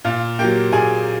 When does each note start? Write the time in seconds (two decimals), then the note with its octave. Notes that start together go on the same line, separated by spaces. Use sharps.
0.04 A#2 F4 F5
0.39 F#3 A#3 G4 G5
0.72 A#2 G#4 G#5